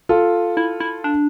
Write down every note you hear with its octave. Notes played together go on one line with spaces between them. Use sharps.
F4 A4
E4
E4
D4